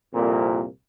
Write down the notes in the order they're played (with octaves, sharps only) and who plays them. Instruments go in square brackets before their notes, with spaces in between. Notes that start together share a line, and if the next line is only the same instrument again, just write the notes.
[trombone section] C2 F2 A#2